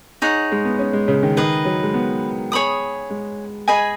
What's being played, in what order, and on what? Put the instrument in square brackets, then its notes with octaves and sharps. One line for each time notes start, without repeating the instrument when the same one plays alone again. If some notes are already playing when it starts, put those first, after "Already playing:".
[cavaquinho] D#4 G#4 C#5 F#5
[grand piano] G#3
B3
C#4
G#3
C#3
D#3
[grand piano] D#3 [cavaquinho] G#4 B4 D#5
[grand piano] F#3
G#3
B3
[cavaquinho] G#4 C#5 B5 D#6
[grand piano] G#3
[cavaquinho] G#4 D#5 G#5 B5